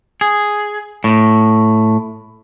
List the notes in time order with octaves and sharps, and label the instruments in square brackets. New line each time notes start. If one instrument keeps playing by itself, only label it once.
[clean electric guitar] G#4
A2